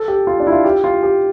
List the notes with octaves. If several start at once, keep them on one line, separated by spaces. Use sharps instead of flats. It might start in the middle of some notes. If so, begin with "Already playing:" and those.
Already playing: A4
G4
F4
D4
E4
F4
G4
F4
G4